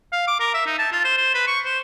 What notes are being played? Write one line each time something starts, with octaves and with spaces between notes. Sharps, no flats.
F5
D6
A#4
E5
D#4
A5
F4
C5
C5
B4
C#6
C5